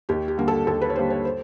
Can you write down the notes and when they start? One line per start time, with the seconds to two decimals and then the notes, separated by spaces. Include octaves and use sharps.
0.09 D#2 G4
0.28 G4
0.38 D3 G3 A#3
0.48 A4
0.67 D#2 A4
0.81 B4
0.90 C#5
0.96 D3 G3 A#3 C5
1.10 C#5
1.25 C5